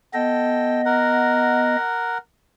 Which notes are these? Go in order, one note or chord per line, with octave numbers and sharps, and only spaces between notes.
B3 A4 D#5 G5
A#4 F#5